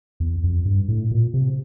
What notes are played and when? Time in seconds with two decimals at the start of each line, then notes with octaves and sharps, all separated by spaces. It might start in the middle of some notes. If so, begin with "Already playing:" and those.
0.20 E2
0.44 F2
0.66 G2
0.88 A2
1.11 A#2
1.34 C3